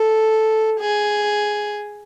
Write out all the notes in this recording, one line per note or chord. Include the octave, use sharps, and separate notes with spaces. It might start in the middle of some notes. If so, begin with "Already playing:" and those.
Already playing: A4
G#4